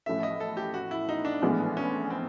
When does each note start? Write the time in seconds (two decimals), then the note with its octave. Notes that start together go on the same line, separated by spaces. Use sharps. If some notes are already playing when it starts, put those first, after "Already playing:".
0.06 A1 A2 F3 A3 C#4 E5
0.23 D#5
0.40 A4
0.57 G4
0.74 F#4
0.91 E4
1.09 D#4
1.25 D4
1.42 A#1 A2 E3 G#3 B3
1.77 C#4
2.10 C4